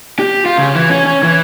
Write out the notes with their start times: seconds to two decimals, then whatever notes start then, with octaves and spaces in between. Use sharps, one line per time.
0.19 G4
0.46 F4
0.58 C#3
0.75 E3
0.90 C#4
1.06 C#4
1.23 E3